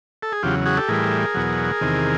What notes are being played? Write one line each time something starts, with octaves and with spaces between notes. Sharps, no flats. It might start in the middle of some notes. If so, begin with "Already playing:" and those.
A4
G#4
E2 C#3 F#3 F4 G4
F#4 G#4
G4 A4
A2 E3 G3 G#4 A#4
E2 B2 F#3
E2 C3 D#3